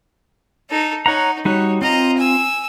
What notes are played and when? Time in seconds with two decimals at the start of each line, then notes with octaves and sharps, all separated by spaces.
0.69 D#4 A4
1.06 D#4 C#5 F#5 A#5
1.45 G3 D#4 F#4 C#5
1.82 C4 F4 D#5 A#5
2.17 G#5 E6